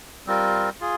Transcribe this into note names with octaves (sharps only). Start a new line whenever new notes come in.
G3 C4 F4 A#4
F4 G#4